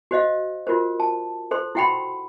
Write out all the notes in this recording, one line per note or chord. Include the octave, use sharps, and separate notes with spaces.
F#4 C5 D#5 F5
F4 F#4 A#4 C5
A5
A4 C5 C6
E4 F#4 F#5 G5 B5 C6